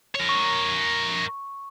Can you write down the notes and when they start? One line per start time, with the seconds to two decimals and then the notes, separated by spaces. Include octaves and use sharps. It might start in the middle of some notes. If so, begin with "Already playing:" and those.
0.15 A#4 C#5
0.29 C#6